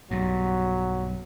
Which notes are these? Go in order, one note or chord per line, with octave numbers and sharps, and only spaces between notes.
B1 G2 F#3